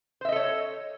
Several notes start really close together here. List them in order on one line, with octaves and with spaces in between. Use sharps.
C5 E5 D#5 A4 C#5